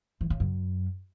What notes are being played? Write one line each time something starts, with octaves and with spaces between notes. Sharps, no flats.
E3
C#3
F#2